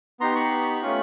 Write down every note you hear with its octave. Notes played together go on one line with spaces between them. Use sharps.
B3 D#4 G4 A#5 C6
B5 C#6
A3 C#4 F4